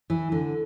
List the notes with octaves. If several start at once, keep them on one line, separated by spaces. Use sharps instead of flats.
E3
D3